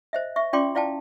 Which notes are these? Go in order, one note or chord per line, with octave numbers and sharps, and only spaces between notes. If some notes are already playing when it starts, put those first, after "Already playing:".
C5 D#5 E5
E5 C#6
C#4 F4 D5 G5 C6 D6
E4 D5 F5 G5 A5